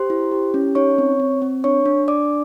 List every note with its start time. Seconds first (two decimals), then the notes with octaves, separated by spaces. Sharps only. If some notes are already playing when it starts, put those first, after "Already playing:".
Already playing: G4 C5 C6
0.10 E4
0.32 G4
0.54 C#4
0.75 D#4 C#5 C#6
0.98 C4
1.20 C4
1.42 C4
1.64 D4 C#5 C#6
1.86 D4
2.08 D4 D5 D6